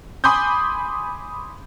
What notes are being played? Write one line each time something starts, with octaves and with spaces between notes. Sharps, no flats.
G#5 B5 C6 D6 D#6 G6